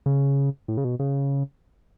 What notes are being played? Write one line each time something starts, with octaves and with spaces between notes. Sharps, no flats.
C#3
A2
C#3
B2
C#3